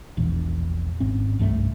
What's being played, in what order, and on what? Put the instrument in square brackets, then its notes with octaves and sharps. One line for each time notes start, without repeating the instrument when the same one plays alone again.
[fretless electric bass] E1 A#1 E2
G#1 C4 C#4
C2 G2 A3